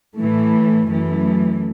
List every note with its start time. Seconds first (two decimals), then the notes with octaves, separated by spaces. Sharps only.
0.16 A2 E3 A3
0.87 F#2 E3 A3